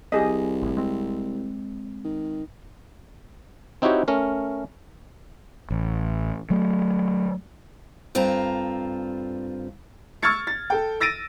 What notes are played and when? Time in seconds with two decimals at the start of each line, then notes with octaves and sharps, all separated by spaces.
0.12 C2 G4 G#4 D#5
0.62 G#1 A2
0.77 G#3 C4
2.04 D#3
3.82 C4 D#4 E4 F#4 G4 C#5
4.08 A3 C#4 A#4
5.70 A1
6.50 F#3 A3
8.15 G2 C4 F4 A4 A#5
10.22 C#6 E6 F6 G#6 A6 C#7
10.47 A6
10.70 A4 G5
11.00 E6 A6 A#6 D7 D#7